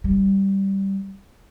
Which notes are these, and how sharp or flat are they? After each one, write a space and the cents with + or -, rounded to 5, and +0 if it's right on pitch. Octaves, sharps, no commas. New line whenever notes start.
G3 -5